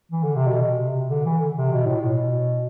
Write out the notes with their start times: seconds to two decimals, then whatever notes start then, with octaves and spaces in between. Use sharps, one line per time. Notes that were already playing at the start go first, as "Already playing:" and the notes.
0.12 E3
0.23 D3
0.36 C3
0.47 B2
0.78 C3
1.10 D3
1.25 E3
1.41 D3
1.57 C3
1.72 B2
1.86 A2
2.00 B2